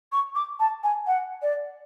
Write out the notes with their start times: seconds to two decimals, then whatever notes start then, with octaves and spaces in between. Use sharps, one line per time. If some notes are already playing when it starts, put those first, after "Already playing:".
0.12 C#6
0.35 D6
0.60 A5
0.84 G#5
1.07 F#5
1.42 D5